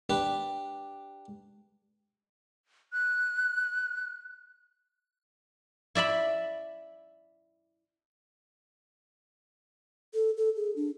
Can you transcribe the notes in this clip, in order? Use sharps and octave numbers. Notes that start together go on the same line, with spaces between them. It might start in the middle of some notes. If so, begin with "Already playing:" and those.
D4 G4 B4
F#6
E4 D5 E5 B5
A4
A4
G#4
D4